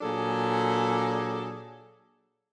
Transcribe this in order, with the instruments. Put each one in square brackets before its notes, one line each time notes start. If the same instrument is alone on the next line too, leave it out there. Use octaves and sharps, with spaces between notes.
[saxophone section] A#2 F#3 D4 G#4 A4